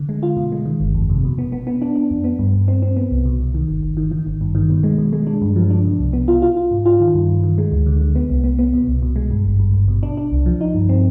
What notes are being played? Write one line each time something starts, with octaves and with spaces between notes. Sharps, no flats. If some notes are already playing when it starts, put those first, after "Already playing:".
Already playing: D3
G#3
F4
B2
G#3
D#3
G1
F2
C3
B2
B3
B3
B3
D4
D4
F2
B3
G2
G2
C4
C4
B3
C2
B2
C2
D#3
G1
G1
D#3
D#3
G#1
G2
D#3
B2
G#3
B2
G#3
D4
G2
F3
D4
B2
C2
B3
F4
F4
F4
G#2
F4
D#3
G2
G2
D#3
G#3
D2
D3
D3
B3
C2
B3
B3
B2
C2
B2
G#3
G2
G#1
G2
G#1
B2
D4
D4
C2
F3
D#4
G2
C4